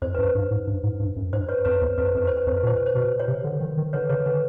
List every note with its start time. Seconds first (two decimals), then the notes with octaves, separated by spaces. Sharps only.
0.02 F2 C5
0.14 F#2 B4
0.27 C5
0.35 G2
0.51 G#2
0.67 G2
0.83 G#2
1.00 G2
1.16 F#2
1.33 G2 C5
1.49 B4 C#5
1.65 F2 B4 C#5
1.81 E2 C5
1.98 F2 B4
2.07 C5
2.15 F2
2.17 B4
2.27 C5
2.37 B4
2.47 F2 C5
2.56 B4
2.63 A#2 C5
2.76 B4
2.86 C5
2.95 B2 B4
3.20 C#5
3.28 C3 C5
3.44 D3
3.60 D#3
3.77 D#3
3.93 D3 B4 C#5
4.09 C#3 B4 C#5
4.26 D3 B4